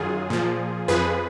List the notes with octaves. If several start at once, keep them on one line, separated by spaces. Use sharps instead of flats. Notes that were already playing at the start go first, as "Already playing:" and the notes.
Already playing: F#2 D#3 F#3 F4 G#4
A#2 F3
F2 F3 G#4 B4